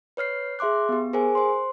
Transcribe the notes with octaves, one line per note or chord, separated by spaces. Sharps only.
B4 C#5 F6 C7
G#4 E5 C6 D6 F#6
B3 G4
G#4 A#4 C5 G#5
C5 C6